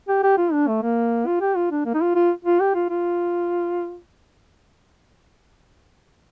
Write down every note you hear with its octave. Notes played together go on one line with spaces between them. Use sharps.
G4
G4
F4
D4
A3
A#3
F4
G4
F4
D4
A#3
D#4
F4
F4
F4
G4
F4
F4